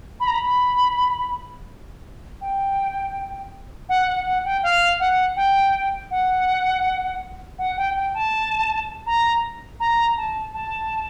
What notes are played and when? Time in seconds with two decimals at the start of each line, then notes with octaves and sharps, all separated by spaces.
0.20 B5
0.27 A#5
0.35 B5
2.41 G5
3.89 F#5
4.07 F#5
4.26 F#5
4.45 G5
4.63 F5
5.00 F#5
5.36 G5
6.11 F#5
7.58 F#5
7.77 G5
7.96 G5
8.14 A5
9.06 A#5
9.80 A#5
10.17 A5
10.54 A5